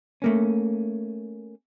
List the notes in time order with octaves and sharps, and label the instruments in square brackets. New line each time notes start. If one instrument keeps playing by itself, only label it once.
[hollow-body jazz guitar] A3 A#3 C#4